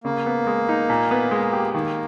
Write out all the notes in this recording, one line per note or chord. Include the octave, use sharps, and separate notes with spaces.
C#3 A#3
B3
G#3
D#4
A#2
B3
G#3
G4
D#3 A#3